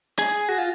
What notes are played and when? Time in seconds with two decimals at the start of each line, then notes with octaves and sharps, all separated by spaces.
0.19 G#4
0.49 F#4
0.58 F4